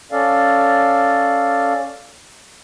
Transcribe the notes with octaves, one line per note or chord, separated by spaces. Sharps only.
C#4 A4 D5 F5